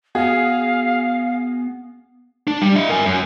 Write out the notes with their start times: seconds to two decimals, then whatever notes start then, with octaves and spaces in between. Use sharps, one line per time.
0.15 B3 F#4 G#4 F5
2.48 D4
2.62 G3
2.76 E4 D#5
2.89 A#4 G#5
3.06 F#2